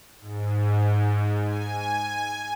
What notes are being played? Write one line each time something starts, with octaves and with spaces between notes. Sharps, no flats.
G#2
G#5